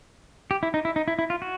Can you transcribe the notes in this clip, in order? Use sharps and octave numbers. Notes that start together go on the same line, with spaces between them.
G4
E4
D#4
E4
D#4
E4
E4
F4
F#4